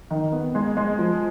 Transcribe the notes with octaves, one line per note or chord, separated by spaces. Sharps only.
D#3
B3
G#3
G#3
F3